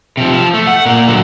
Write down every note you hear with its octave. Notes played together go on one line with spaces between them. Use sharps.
C3 F3
F3
A3
F#5
A#2 A#3
D3 F#3